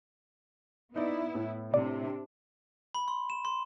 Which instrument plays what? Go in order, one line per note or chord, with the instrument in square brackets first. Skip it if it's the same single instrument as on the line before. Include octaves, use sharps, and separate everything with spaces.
[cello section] B3 E4 [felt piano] D#4 D5
[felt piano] A2
[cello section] C3 D4 [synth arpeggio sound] D5
[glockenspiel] B5
C6
E7
C6